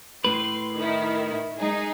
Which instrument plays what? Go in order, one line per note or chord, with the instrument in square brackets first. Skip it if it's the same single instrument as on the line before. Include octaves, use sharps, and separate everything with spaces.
[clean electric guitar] A2 B4 [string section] C6
[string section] D#3 E4
G#3 D#4 G#4